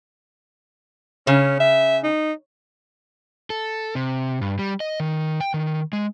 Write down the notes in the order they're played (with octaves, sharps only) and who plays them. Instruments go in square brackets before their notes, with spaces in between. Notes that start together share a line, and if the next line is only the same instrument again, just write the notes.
[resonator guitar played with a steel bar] C#3 [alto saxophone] C#4
[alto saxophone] E5
D#4
[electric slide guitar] A4
C3
G2
G3
D#5
D#3
G5
D#3
G#3